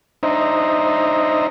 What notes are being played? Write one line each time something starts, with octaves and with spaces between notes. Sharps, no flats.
D4 D#4 C5 D#5 E5 A#5